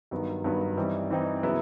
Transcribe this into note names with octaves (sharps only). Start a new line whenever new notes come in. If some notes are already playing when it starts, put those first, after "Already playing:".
G2 D#3 F#3 B3
G2 D#3 F#3 B3
E3 G3 C4 D#4
E3 G3 C4 D#4
C#3 F#3 B3 E4